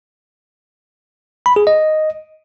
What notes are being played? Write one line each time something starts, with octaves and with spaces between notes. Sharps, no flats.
B5
G#4
D#5